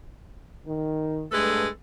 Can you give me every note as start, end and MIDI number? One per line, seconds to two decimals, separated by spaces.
0.67 1.24 51
1.32 1.66 43
1.32 1.68 56
1.32 1.66 57
1.32 1.68 69
1.32 1.68 71